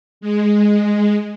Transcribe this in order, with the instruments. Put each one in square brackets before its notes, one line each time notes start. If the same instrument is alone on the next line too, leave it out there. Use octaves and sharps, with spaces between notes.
[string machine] G#3